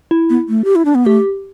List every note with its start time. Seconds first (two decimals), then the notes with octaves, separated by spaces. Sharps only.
0.11 E4
0.30 B3
0.49 A3
0.64 G4
0.75 E4
0.85 D4
0.95 B3
1.06 A3 G4